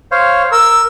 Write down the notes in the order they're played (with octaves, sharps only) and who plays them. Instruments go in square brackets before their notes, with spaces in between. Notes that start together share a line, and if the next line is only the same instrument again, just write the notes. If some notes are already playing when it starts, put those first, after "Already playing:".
[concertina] C5 C#5 F5
[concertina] A#4 [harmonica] E6